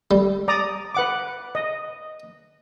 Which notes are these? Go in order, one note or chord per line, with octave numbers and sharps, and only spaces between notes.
G3
D5 A#5 D#6
B4 F#5 D6
D#5